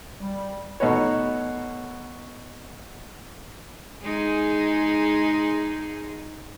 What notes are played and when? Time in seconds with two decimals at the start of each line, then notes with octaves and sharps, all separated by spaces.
0.20 G3
0.80 B2 A3 D#4 F#4 B4 C#5
4.02 G#3 D#4 G#4